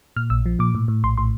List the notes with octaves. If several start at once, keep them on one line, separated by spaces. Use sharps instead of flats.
A#2 F6
A#1 E6
F3
A#2 D6
A2
A2
A#1 C6
A2 C6